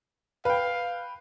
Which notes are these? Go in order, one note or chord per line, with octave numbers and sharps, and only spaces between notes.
B4 F5 G5